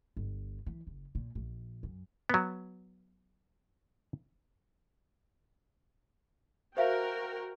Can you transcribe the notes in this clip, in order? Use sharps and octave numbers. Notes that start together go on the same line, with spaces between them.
G1
E3
F#1
A#2
A#1
F#2
F#3 B3
F#4 A#4 C5 E5 F5 G5